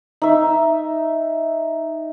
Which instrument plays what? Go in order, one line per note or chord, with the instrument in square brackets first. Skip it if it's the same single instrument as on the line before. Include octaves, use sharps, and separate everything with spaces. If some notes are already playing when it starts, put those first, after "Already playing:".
[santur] D#4 E5